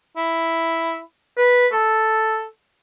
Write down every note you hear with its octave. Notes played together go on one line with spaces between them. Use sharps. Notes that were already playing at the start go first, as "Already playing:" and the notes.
E4
B4
A4